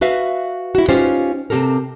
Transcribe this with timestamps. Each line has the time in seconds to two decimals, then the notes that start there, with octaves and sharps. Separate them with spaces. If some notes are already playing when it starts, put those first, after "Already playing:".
0.01 F#4 B4 E5 F5
0.75 E4 F#4
0.89 C#4 D#4 F4 G4 B4 C5
1.50 C3 C4 G4 A4 A#4